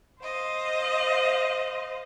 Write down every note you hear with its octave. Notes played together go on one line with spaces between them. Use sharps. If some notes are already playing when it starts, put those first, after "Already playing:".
C5 D#5 F5